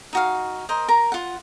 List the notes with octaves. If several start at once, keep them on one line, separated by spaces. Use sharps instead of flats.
D#4 F#4 F5
A#4 C5 D#5
A#4 A#5
F4 F#5